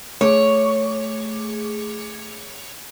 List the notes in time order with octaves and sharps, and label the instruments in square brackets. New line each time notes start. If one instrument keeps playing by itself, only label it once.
[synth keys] A3 G#4 D6 [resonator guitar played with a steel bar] C#5